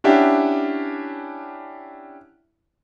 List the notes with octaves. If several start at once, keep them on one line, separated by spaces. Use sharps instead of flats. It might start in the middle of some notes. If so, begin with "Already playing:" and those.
C#4 D4 E4 G4 E5 F#5